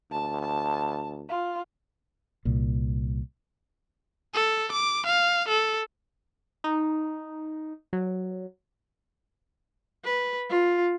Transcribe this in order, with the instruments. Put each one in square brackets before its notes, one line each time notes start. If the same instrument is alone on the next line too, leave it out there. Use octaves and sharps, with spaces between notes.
[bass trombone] D2 [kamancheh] A5
[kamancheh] A5
F4
[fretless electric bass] C2 A#2
[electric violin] A4
D6
F5
A4
[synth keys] D#4
F#3
[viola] B4
F4